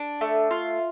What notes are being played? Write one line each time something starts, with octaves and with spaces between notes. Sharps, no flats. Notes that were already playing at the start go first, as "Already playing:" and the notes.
Already playing: D4
A3
F4